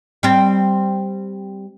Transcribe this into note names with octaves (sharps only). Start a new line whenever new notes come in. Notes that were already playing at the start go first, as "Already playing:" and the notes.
G3 C4